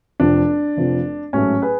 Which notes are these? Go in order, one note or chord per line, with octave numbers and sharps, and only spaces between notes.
F1 F2 F3 D4
F1 F2 F3
A1 G#2 F#3 A3 C#4
G#4 B4